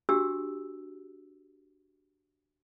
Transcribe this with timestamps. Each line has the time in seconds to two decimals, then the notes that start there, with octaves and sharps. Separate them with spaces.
0.09 D4 F#4 G4 E6